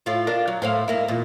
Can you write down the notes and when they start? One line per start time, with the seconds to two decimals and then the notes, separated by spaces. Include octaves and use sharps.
0.06 A2 F4
0.27 D4 F4 A#4
0.47 F#3
0.62 A2 C5 F5
0.88 G#2 A#3 E4
1.08 E2 A#2